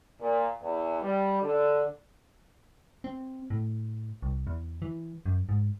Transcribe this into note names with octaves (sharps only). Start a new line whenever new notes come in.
A#2
E2
G3
D3
C4
A2
C2
E2
E3
F#2
G#2